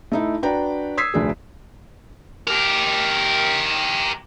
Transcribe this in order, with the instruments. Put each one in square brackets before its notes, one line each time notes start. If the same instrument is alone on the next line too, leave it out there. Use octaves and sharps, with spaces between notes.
[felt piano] A3 D#4 E4
D4 F#4 B4 D5 G5 A#5
D#6 E6 G#6 B6 C7
F1 D2 D4 G#4
[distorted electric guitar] G4 A#4